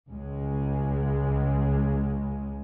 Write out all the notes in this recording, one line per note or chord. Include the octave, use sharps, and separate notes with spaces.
C#2 C#3 G#3